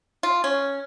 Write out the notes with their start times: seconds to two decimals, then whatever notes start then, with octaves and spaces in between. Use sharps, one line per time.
0.23 F4
0.44 C#4